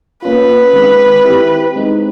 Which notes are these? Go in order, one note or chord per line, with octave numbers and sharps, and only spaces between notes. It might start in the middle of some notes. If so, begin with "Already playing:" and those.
A#3 C#4 F4 B4
D#3 G#3 C4
C4 E4 G4
G#3 C4 D#4